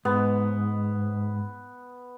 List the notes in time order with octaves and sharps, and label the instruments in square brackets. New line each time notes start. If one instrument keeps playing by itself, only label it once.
[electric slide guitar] G#2 [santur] B3